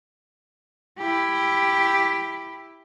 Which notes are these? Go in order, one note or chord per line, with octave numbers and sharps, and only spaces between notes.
E4 G4